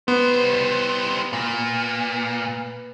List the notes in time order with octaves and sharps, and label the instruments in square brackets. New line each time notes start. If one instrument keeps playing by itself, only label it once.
[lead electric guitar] G3 C5 [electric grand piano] B3
[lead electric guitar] A#2